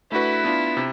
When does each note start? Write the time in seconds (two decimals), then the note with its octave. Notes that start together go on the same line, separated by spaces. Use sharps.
0.12 A3 D4 E4 F#4 B4
0.44 B3 D4 F4
0.77 C3